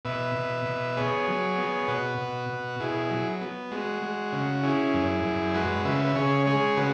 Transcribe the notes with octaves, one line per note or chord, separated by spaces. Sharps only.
B2 B4 E5
B2
B2
B3 G#4 C#5
F#3
B3
B2 F#4 B4
B2
B2
B2 E4 G#4
F#3
B3
G#3 F#4
G#3
C#3
C#4 E4 G#4
F#2
F#2
G#3 F#4 B4
C#3 B4 E5
B4
C#3 G#4 C#5
G#3 G#4 C#5
C#3 F#4 B4